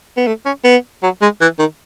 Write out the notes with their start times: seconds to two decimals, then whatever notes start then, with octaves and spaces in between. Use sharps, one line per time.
0.17 B3
0.27 A3
0.45 C#4
0.64 B3
1.03 F#3
1.22 G#3
1.41 E3
1.59 D#3